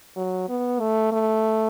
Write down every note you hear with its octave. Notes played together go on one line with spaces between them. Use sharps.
F#3
B3
A3
A3